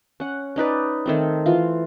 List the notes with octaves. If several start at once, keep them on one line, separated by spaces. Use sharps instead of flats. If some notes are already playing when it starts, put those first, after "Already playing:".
C#4 F#5
C#4 D#4 B4 D5
D#3 A3 C4
E3 F4